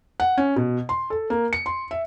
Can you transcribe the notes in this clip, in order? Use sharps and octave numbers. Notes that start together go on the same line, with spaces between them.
F#5
C#4
B2
C6
A4
A#3
C#7
C6
E5